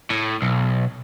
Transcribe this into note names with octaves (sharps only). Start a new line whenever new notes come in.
A2
B1